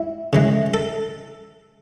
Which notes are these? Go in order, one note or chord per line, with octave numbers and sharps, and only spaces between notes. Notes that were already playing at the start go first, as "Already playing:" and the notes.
Already playing: E4
C#3 E3 G#3
A4